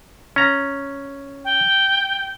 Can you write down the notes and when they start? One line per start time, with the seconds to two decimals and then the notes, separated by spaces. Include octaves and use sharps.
0.36 C#4 A#5
1.45 G5